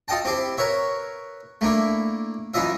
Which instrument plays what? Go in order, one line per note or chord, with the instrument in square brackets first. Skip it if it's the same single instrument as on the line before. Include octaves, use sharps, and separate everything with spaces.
[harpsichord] F4 A4 D#5 G5 A5
C4 E4 G4 C5
A#4 B4 C#5 E5
A3 A#3 D4 E4
F#2 E3 E4 F4 D#5 E5